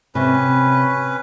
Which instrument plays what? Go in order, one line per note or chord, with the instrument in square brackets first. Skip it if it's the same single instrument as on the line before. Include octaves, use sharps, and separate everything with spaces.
[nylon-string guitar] C3 [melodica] C#4 B4